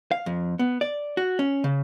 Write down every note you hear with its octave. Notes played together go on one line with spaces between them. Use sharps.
F5
F2
B3
D5
F#4
C#4
C#3